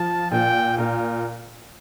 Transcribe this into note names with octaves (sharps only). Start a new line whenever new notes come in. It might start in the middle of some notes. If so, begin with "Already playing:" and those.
Already playing: F3 A5
A#2 G5
A#2 A#4